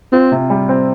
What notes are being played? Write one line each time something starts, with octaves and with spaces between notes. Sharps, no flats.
C4 F4
C3
G3
C4